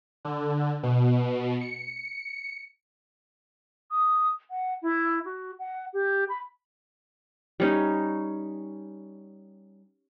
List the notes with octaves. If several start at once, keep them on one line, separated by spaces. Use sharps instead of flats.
D3
B2
C#7
D#6
F#5
E4
F#4
F#5
G4
B5
G3 C#4 D#4